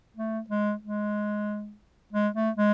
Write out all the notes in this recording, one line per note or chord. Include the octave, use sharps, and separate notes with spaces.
A3
G#3
G#3
G#3
A3
G#3